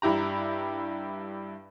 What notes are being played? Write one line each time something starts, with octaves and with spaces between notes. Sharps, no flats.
G2 E4 G4 A#5